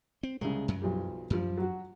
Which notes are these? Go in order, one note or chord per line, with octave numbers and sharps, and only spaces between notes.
C4
C2 C#3 G#3
F#2 F#3
B1 F3 G3
F#2 F3 G3
F#3 F#4